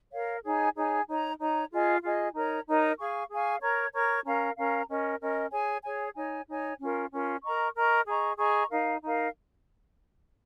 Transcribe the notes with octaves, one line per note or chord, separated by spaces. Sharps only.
A#4 C#5 F5
D#4 G#4 C#5 G#5
D#4 G#4 C#5 G#5
D#4 C#5 A#5
D#4 C#5 A#5
F4 G#4 D#5 G#5
F4 G#4 D#5 G#5
D#4 A#4 C#5 A#5
D#4 A#4 C#5 A#5
G#4 F5 G#5 C#6
G#4 F5 G#5 C#6
A#4 C#5 A#5 C#6
A#4 C#5 A#5 C#6
C#4 A#4 F5 A#5
C#4 A#4 F5 A#5
C#4 A#4 D#5
C#4 A#4 D#5
G#4 C#5 G#5
G#4 C#5 G#5
D#4 C#5 G#5
D#4 C#5 G#5
C#4 F4 A#4
C#4 F4 A#4
A#4 D#5 A#5 C#6
A#4 D#5 A#5 C#6
G#4 D#5 A#5 C#6
G#4 D#5 A#5 C#6
D#4 A#4 F5
D#4 A#4 F5